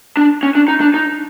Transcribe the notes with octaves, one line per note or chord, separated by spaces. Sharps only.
D4
C#4
D4
D#4
D4
D#4